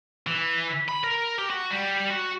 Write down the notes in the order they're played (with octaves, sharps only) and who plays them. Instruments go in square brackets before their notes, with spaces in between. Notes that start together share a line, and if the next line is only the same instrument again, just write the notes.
[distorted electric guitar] E3
B5
A#4
G4
F#4
G3
F#4